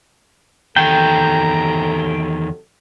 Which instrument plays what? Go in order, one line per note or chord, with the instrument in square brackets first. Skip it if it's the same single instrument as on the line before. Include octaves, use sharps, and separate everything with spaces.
[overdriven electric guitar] E2 D#3 [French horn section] C3 F#3 A4 [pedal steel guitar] G5 [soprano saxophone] A#5